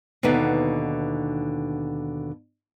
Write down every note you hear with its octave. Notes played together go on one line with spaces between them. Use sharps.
D#2 B2 D3 B3 D#4